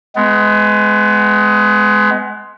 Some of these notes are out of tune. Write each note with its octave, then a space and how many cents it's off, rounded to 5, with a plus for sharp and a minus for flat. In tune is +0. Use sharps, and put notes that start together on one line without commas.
G#3 +15 B3 +30